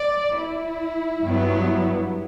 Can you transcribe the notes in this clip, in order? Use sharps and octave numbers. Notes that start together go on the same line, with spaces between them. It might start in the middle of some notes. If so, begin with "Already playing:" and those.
Already playing: D5
E4
G2 F#3 B3